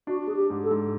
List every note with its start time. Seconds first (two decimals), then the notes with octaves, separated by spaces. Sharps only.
0.07 D4 F#4
0.27 D4 G#4
0.36 G4
0.50 G#2
0.64 A4
0.71 G#2